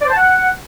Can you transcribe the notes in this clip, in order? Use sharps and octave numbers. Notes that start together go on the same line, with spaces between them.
D5
C5
A5
F#5